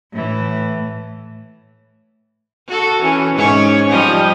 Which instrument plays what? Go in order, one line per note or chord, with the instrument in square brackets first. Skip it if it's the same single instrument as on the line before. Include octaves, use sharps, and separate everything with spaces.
[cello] A2 E3
[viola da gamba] F#4 A4
E3 C#4
G#2 C#4 C#5
F3 G3 D#5